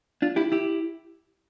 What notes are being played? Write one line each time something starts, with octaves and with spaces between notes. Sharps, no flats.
D4 F4
E4 G4
E4 G4